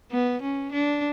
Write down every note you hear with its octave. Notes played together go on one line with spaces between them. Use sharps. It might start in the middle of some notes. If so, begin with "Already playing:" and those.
B3
C#4
D4